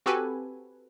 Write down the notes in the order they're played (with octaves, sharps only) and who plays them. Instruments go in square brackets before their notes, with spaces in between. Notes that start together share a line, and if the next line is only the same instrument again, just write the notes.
[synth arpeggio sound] C4 F#4 G4 A4 B4 G#5